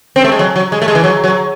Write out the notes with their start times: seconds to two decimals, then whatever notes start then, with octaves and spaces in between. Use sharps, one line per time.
0.16 C4
0.24 A3
0.32 G#3
0.39 F#3
0.56 F#3
0.72 G#3
0.82 A3
0.88 G#3
0.95 E3
1.04 F#3
1.24 F#3